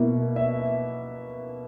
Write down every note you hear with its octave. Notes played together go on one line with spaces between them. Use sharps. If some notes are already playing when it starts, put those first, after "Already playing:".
Already playing: B2 A#3 E4
E5